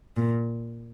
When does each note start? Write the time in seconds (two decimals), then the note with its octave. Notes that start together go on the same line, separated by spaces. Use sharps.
0.17 A#2